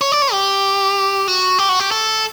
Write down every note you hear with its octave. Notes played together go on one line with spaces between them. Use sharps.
C#5
D5
C#5
G4
F#4
G4
F#4
G4
A4